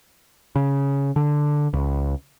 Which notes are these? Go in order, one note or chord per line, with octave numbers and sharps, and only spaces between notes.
C#3
D3
C#2